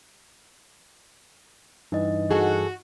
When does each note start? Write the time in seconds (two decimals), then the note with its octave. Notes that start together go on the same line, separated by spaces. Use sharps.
1.92 G2 E3 D#4 D#5
2.31 F#4 G#4 A4